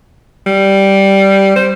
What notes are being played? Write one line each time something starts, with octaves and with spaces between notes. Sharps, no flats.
G3
C5